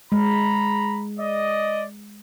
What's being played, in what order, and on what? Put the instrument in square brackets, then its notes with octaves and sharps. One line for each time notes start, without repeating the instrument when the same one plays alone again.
[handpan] G#3 [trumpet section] A#5 B5
[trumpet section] D5 D#5